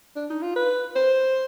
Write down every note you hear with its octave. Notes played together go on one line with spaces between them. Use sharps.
D4
D#4
F4
B4
C5